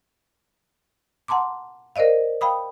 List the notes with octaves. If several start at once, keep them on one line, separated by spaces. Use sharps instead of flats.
F#5 A5 A#5 C6 D6
A#4 C5 D5 D#5 F5
F5 G5 B5 D#6